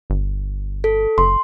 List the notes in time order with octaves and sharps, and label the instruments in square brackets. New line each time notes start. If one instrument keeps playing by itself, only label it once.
[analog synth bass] G1
[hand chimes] A4
[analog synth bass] F#1 [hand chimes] C6